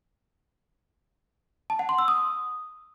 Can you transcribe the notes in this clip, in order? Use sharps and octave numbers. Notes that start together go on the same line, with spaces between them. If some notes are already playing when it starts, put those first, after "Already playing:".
A5
F#5
C6
E6
D#6